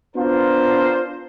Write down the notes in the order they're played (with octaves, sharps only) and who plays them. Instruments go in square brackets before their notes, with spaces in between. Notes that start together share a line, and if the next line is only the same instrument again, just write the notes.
[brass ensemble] B3 D4 F4 A#4 C5